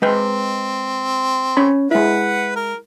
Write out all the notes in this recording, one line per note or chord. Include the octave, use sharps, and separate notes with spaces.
G#3 C4 B4 G5
C#4 B5
G#3 E4 B4 F#5
A#4